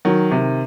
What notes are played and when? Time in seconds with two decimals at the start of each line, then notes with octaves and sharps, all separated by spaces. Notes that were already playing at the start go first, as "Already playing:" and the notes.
0.05 D#3 F#3
0.31 C3 D#3